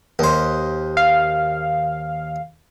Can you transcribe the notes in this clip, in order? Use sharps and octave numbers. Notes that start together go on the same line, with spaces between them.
D#2 C5
F5